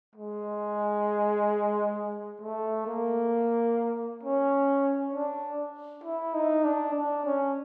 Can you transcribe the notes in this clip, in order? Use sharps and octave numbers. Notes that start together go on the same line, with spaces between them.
G#3
A3
A#3
C#4
D4
E4
D#4
D4
D4
C#4